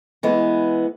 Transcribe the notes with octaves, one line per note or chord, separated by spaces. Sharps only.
E3 G#3 B3